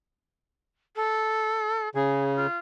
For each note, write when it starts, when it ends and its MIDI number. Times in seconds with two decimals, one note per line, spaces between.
0.96 1.89 69
1.95 2.47 49
1.95 2.33 68
2.36 2.58 65